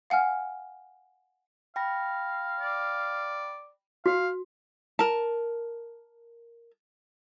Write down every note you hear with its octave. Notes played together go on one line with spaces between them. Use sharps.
F5 F#5 G#5 F6
F5 G5 B5 A#6
D5
F#4 F5
A#4 A5